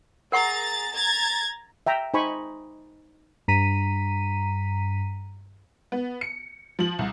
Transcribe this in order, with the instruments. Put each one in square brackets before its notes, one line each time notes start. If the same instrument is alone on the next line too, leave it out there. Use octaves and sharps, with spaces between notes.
[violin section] G#4 A#5 A6 [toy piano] A#4 F#5 C#6
[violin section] A#5 G#6 A6
[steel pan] E5 G5 A#5
D#4 C5 G#5 B5 C#6
[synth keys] G2 A#5 B6 D#7
[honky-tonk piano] B3
C#7
F3 F#7
C2